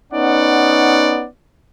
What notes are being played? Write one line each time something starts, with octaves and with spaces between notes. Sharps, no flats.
B3 C#4 D#4 D5 F#5